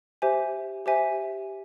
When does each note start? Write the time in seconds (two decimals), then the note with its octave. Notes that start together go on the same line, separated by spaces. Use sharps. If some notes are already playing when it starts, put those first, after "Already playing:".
0.22 G4 C5 E5 G#5
0.86 G4 C5 E5 G#5